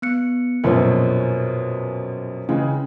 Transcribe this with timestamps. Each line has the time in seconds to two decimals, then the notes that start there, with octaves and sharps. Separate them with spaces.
0.02 B3 F#6 C#7
0.64 A#1 F#2 B2 A#4 C5 C#5
2.49 C#3 E3 G#3 C#4